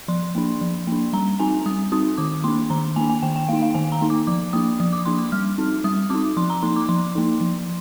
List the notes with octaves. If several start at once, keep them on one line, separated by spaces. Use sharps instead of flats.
F3 C6
A#3 D4
F3
A#3 D4
G3 A#5
C4 D#4 G#5
G3 D#6
C4 D#4 D#6
D#3 D6
A#3 D4 C6
D#3 A#5
A#3 D4 G#5
G#5
D#3 G5
G5
A#3 D#4 F5
F5
D#3 G#5
A#5
A#3 D#4
D6
F3 D6
A#3 D4 D#6
F3 D#6
D6
A#3 D4 C6
D6
G3 F6
C4 D#4
G3 D#6
C4 D#4 D6
F3 C6
A#5
A#3 D#4 C6
D6
F3 C6
A#3 D#4
F3